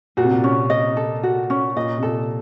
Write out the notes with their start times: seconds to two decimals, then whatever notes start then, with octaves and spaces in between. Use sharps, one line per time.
0.17 A#2 F#4
0.24 C3
0.31 A#2
0.44 C#4
0.70 D#5
0.97 A4
1.23 F#4
1.50 C#4
1.76 A#2 D#5
1.97 C3
2.03 A#2 A4